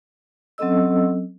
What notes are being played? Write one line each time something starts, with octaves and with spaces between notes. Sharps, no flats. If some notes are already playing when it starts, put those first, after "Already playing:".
F#3 C4 C#4 A4 D#5 E6